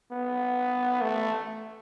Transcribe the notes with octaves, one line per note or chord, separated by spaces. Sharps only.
B3
A3